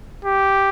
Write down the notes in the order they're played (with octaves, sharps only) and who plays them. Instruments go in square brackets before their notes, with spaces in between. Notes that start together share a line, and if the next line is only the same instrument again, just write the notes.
[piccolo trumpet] G4